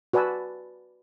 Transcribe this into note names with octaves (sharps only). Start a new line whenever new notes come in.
F#4 B4 D5 G#5 A5 E6